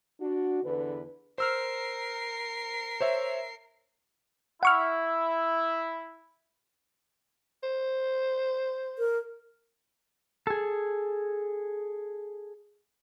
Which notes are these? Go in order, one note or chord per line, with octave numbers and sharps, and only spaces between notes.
D4 F#4
E2 D3 B4
A#4 C5 E6 F6 C7
C5 C#5 E5
E4 F#5 C#6 F6
C5
A#4
G#4 A4